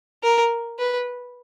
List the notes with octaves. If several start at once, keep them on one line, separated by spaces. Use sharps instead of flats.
A#4
B4